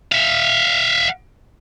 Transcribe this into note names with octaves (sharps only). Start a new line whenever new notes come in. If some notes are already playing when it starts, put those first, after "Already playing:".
E5 F5